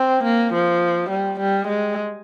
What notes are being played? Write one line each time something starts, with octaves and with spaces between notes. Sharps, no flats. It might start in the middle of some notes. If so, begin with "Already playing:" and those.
Already playing: C4
A#3
F3
G3
G3
G#3